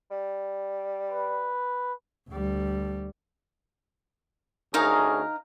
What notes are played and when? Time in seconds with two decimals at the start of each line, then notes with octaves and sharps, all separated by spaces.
0.11 G3
1.11 B4
2.30 D2 G3
4.74 D2 C#4 D#4 G#4 A#4 F5